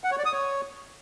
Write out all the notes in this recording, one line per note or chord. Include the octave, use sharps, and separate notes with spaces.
F#5
C#5
D5
D#6
C#5